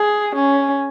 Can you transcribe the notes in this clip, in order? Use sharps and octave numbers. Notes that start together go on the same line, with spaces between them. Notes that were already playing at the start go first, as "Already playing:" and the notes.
Already playing: G#4
C#4